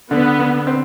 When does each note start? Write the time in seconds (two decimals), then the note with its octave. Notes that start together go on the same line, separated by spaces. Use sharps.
0.11 D3 B3
0.39 D3
0.67 C4